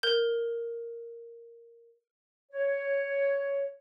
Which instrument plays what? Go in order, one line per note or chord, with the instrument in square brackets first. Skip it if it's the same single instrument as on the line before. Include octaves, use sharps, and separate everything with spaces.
[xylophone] A#4 G6
[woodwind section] C#5